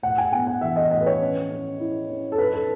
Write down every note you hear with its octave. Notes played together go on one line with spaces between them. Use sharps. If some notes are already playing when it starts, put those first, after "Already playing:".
A2 F#5
G#5
B3 G#5
F#5
E3 E5
D#5
A2 D#5
B4
C#5
C#4
C#4
E4
C#4
A4
D#4 B4
A4